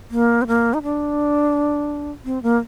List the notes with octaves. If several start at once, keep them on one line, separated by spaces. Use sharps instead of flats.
A#3
C4
A#3
D#4
D4
C4
A#3